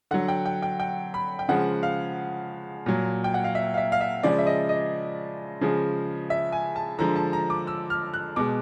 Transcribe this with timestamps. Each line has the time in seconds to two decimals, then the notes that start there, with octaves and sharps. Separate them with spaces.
0.11 D3 F#3 F#5
0.28 G5
0.46 G5
0.62 G5
0.80 G5
1.14 B5
1.39 G5
1.49 C#3 F3 G#3 F#5
1.83 F5
2.86 A#2 F#3
3.24 G5
3.34 F#5
3.44 F5
3.55 E5
3.74 F5
3.77 E5
3.92 F5
4.01 E5
4.23 C#3 F3 G#3 D5
4.39 E5
4.47 D#5
4.69 D#5
5.61 C#3 F3 G#3
6.30 E5
6.52 G#5
6.76 A5
6.99 D3 F3 G#3 A#5
7.16 A5
7.33 A#5
7.50 D6
7.67 E6
7.90 F6
8.14 F#6
8.36 B2 G#3 D6